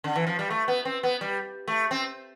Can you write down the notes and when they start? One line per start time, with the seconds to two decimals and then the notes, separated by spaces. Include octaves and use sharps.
0.04 D3
0.16 E3
0.27 F3
0.39 G3
0.50 A3
0.68 B3
0.85 C4
1.03 B3
1.21 G3
1.68 A3
1.91 C4